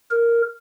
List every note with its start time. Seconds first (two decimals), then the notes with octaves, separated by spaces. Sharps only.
0.11 A#4